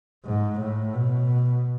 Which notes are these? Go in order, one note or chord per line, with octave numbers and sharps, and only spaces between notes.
G#2
A2
B2